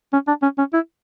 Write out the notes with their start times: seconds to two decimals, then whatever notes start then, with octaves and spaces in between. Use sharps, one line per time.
0.13 C#4
0.28 D4
0.43 C#4
0.58 C#4
0.73 E4